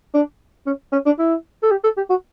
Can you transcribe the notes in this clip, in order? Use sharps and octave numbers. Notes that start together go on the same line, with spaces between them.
D4
C#4
C#4
D4
E4
A4
G4
A4
G4
F#4